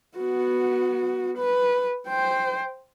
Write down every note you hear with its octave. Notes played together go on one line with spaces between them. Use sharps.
B3 F#4
B4
C5 G5